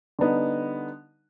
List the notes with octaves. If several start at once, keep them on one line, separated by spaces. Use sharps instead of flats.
D3 G3 B3 D#4